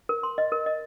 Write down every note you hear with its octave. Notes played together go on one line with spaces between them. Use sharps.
A#4
C6
D#5
A#4
D#5